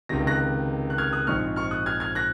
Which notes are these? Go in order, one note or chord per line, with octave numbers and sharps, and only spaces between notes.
C#2 C3 D#3 A#6
F#6 A#6
F#6
F6 G#6
D#6 F#6
A#1 G#2 F3 C4 D#4 C#6 F6
C#6 F6
D#6 F#6
F6 G#6
F6 G#6
F#6 A#6